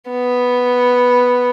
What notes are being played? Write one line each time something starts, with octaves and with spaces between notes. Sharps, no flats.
B3